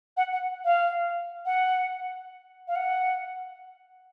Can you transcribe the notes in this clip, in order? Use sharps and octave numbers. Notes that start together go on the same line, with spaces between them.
F#5
F#5
F5
F#5
F5
F#5